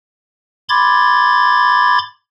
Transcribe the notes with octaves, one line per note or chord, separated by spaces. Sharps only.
B5 C6 D6 G#6 A6